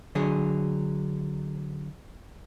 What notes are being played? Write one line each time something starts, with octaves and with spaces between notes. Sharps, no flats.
D3 F#3 G#4